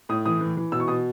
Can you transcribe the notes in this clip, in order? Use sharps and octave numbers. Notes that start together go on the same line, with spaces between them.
A2 D#6
E3 D#6
E3
E3
B2 E6
C#6
B2 D#6